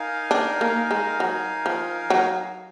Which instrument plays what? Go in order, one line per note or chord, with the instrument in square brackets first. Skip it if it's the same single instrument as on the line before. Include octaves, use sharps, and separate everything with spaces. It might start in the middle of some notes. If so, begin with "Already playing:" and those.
Already playing: [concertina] D#4 A#4 F5 G#5
[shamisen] D4
A#3
G#3
F#3
F3
F#3